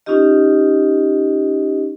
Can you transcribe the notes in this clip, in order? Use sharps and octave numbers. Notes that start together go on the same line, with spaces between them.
C#4 D#4 F4 G4 D#5